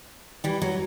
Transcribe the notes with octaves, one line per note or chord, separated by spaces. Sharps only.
E3 G3
F#3